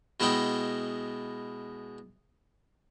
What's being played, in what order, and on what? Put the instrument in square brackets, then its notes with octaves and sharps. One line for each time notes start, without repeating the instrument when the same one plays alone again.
[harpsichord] B2 G#3 E4 D#5 F#5 G5